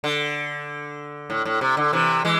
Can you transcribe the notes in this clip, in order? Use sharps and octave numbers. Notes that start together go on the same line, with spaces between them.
D3
A2
A2
C3
D3
C3 E3
E3 G#3